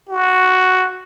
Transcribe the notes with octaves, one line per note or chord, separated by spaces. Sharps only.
F#4